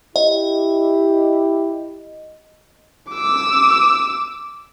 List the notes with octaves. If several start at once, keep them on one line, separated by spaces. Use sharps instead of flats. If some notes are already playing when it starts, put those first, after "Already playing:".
E4 G4 D#5
D6 E6